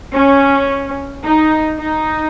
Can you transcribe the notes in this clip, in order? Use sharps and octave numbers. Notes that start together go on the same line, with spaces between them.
C#4
D#4
D#4